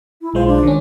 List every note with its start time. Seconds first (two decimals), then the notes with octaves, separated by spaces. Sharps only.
0.21 E4
0.34 B1 G#3 F4 C5
0.47 D4
0.63 D#3 C#4